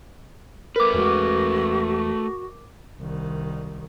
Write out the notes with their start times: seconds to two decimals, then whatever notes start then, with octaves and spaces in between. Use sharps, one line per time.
0.76 A3 A#4 B4 D6
0.94 E2 G#3 F#4
2.99 C2 D#3